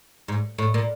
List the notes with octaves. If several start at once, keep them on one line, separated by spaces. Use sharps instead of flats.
G#2
A2
A#2